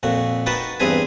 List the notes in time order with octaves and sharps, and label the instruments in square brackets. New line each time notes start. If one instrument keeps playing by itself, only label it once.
[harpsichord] F2 A#2 F#4
D#4 F#4 B4 G5 A5 B5
E2 G2 C4 G#4 B4 G#5